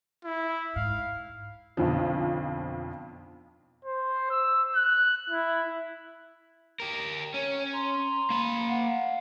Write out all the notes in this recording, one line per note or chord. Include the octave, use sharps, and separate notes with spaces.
E4
G#2 F5
B1 F2 D3 F3
C5
E6
F#6
E4
G4 A#4
C#4 C#5
A#5 C6
A#3 B5
F5 F#5